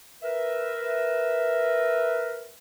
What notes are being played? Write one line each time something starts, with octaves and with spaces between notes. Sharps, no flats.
A#4 B4 E5